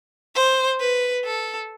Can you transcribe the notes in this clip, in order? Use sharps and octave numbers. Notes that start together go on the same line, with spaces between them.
C5
B4
A4